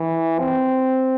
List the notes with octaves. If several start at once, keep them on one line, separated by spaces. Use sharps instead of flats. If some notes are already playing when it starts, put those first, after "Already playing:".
Already playing: E3
C4